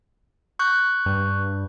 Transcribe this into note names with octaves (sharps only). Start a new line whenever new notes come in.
C#6 F#6 G6
G2